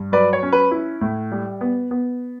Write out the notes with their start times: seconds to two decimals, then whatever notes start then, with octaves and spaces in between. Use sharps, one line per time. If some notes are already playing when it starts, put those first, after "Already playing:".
Already playing: G2
0.12 F#3 B4 D5
0.33 C#5
0.43 C#4
0.52 B4
0.71 E4
1.01 A2
1.32 G3
1.61 B3
1.91 B3